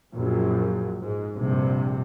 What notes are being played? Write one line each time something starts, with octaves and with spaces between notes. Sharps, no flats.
A#1 F#2
G#2
A#1 G2 C3